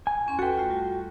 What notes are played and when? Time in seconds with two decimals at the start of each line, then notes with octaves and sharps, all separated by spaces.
0.07 G#5
0.26 E2 C#4 C6
0.39 F#4 A4 B4 G5
0.57 A3 F4
0.71 G3